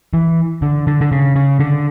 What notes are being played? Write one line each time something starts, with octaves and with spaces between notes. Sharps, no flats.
E3
D3
D3
D3
C#3
C#3
D3